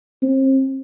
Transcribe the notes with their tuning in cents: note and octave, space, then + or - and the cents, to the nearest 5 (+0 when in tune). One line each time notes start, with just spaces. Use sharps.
C4 +35